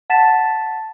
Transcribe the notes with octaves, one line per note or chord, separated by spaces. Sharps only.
F#5 A5 A6 B6 E7